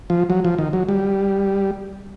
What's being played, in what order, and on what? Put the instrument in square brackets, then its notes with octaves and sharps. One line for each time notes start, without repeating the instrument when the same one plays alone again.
[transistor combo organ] F3
F#3
F3
D#3
F#3
G3